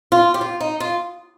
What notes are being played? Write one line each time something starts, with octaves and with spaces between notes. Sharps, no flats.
F4
G4
F4
D#4
F4